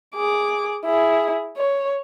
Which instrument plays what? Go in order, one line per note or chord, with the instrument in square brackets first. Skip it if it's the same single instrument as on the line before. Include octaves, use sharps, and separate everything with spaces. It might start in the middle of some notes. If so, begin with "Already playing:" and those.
[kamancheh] G#4 D6
E4 G#4
C#5